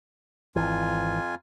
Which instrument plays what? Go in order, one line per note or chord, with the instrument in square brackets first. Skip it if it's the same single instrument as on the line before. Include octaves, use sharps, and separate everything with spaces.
[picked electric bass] G#1 E3 [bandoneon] F2 F4 G#5